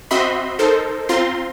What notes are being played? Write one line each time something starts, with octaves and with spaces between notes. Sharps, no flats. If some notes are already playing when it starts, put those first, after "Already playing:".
C4 F#4 D#5 E5 B5 C6
D#4 A4 A#4 C5
C4 F4 A#5 C6